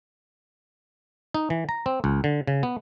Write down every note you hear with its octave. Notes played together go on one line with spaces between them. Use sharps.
D#4
E3
A#5
C4
C#2
D3
C#3
B3